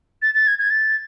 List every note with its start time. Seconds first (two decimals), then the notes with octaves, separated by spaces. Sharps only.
0.22 A6
0.34 A6
0.47 G#6
0.59 G#6
0.70 A6